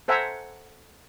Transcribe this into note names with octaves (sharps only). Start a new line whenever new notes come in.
A4 C5 E5 F#5 G#5 A#5